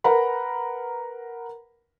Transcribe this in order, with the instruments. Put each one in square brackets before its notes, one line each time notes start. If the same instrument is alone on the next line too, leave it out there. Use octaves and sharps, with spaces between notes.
[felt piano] A#4 B4 F#5 A#5 B5